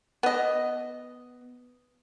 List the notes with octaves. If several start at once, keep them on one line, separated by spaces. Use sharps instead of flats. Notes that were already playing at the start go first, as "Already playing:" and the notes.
B3 D#5